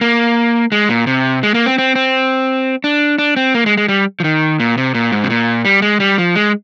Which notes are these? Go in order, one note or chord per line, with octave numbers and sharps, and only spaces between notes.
A#3
G#3
A#2
C3
G#3
A#3
C4
C4
C4
D4
D4
C4
A#3
G#3
G#3
G3
F3
D#3
A#2
C3
A#2
G#2
C3
A#2
G3
G#3
G3
F3
G#3